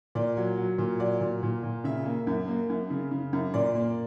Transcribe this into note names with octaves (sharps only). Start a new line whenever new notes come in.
A#2 D5
F#3
F#3
A#2
F#3 D5
A#2
A#2
A#2
C#3 E5
A#3
F#2
A#3
F#2
C#3
C#3
F#2
A#2 D5
A#3